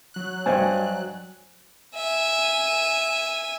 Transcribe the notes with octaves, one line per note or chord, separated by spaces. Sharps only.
F#3 F#6
G2 C5 C#5 D#5 G#5
E5 G#5